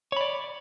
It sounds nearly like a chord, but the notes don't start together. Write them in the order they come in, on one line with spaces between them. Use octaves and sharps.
C#5 B5 D5